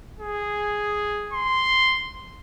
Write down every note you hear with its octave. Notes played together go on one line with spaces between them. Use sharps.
G#4
C6